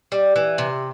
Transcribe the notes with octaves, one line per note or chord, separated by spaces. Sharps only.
G3
E3
C3